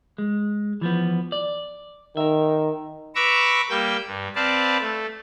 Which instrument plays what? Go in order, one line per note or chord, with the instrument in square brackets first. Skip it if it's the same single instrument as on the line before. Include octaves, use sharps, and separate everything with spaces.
[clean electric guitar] G#3
E3 F3 B3
D5
[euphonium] D#3 [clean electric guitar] A#4 E5
[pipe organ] B4 A#5 C#6 D6 E6
G3 A#3 G5 E6
G2
C4 B4 D5 F5 A5
A3